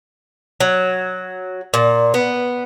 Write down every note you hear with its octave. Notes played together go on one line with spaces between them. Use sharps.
F#3
A#2
B3